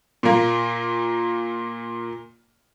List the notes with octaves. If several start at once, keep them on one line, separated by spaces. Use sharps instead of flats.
A#2 A#3